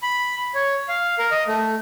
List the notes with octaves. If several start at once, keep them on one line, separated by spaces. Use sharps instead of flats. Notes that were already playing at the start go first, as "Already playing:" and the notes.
B5
C#5
F5
A#4
D#5
A3